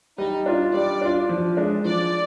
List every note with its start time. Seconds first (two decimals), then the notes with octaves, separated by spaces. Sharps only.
0.18 G3 D#4
0.46 D4 F4
0.74 G3 D5
1.01 D4 F4
1.29 F3
1.57 G#3 D4
1.85 F3 D5